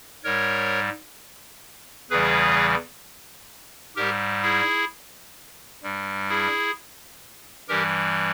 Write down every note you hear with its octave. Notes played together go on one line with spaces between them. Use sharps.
G#2 G3 A#4 C#5
E2 C#3 E3 G3 G#4 B4
G#2 G3 G4 A#4
E4 G#4
G2 G3
E4 G#4
G2 E3 G3 G4 A#4